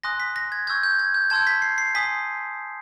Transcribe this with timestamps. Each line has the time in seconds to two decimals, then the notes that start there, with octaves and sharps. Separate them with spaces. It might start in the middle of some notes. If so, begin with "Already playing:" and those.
0.04 G#5 C6 D#6 F#6 A#6
0.20 B6
0.36 A#6
0.52 G#6
0.67 C#6 E6 G6 G#6
0.83 G6
0.99 G#6
1.14 G6
1.30 A5 C6 E6 G6 G#6
1.47 B6
1.62 C7
1.78 C7
1.95 G#5 C6 D#6 B6